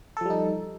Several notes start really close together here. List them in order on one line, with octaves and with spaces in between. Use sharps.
A4 F3 G3 D#4